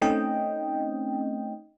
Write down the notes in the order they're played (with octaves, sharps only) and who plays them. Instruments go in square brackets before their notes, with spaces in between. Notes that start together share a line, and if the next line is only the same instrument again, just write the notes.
[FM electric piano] A3 C4 C#4 D#4 D#5 G5